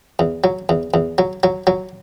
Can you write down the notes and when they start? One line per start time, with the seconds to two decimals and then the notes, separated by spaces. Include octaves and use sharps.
0.19 E2
0.44 F#3
0.69 E2
0.94 E2
1.18 F#3
1.43 F#3
1.67 F#3